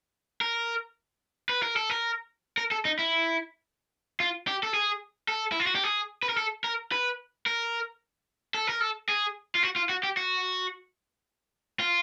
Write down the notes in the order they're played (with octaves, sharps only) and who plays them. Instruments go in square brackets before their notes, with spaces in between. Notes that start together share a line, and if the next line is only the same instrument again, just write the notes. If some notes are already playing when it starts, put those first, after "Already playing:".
[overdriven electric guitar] A#4
B4
A#4
A4
A#4
A#4
A4
D#4
E4
F4
G4
A4
G#4
A4
E4
F4
F#4
G4
G#4
B4
A#4
A4
A#4
B4
A#4
A4
A#4
A4
G#4
F4
F#4
F4
F#4
G4
F#4
F4